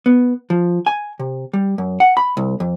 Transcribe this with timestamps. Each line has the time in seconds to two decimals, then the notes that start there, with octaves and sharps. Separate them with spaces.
0.06 B3
0.50 F3
0.86 G#5
1.20 C3
1.53 G3
1.78 F#2
2.00 F#5
2.17 B5
2.37 C2
2.60 F2